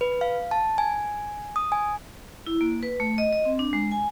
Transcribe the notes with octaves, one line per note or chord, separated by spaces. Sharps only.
B4
F5
A5
G#5
D#6
G#5
E4
A#3
B4
A3
D#5
D#5
C4
D4
G#3
G#5